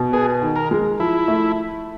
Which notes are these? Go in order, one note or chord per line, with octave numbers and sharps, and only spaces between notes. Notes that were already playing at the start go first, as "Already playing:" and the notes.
Already playing: B2
B3 G#4
D#3
A#4
G#3
F3 E4
A3